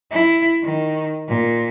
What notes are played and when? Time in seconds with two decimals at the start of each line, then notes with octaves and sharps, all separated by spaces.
0.11 E4
0.62 D#3
1.28 A#2